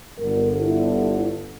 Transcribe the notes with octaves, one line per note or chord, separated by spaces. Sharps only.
G1 D3 A#4
E4